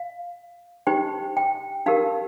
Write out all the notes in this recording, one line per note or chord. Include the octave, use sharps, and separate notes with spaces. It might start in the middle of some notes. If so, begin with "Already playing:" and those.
Already playing: F5
D#4 G4 C5 G5
G5
D#4 G4 A#4 F5